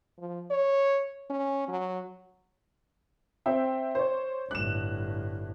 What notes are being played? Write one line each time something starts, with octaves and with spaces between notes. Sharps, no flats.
F3
C#5
C#4
F#3
C4 E5 G5
C5 C#5
G1 A2 F#6 E7